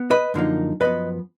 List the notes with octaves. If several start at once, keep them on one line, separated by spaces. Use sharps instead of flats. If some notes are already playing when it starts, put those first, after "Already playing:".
Already playing: B3
B4 D#5
F#2 D3 F3 A#3 D#4
F#2 F3 B3 B4 D#5